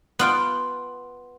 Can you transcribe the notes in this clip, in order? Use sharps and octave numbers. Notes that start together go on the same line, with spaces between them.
B3 F4 G5